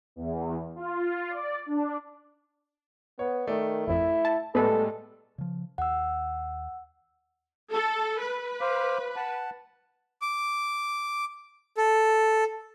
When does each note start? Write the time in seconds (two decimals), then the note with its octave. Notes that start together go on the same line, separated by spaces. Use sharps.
0.16 E2
0.76 F4
1.30 D5
1.66 D4
3.19 B3 C#5
3.47 D#3 A3 D5
3.87 G#1 F2 E4
4.25 A5
4.55 A2 G3 G#3 B3 A4 B4
5.38 C#3 F3
5.78 D#2 F#5 E6
7.72 A4
8.21 B4
8.61 C5 F5 D6
9.16 F#5 A5
10.22 D6
11.77 A4